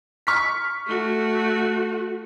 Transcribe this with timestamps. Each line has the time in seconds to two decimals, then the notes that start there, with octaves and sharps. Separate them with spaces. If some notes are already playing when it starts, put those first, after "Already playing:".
0.27 C#6 F6 B6
0.88 A3 F#4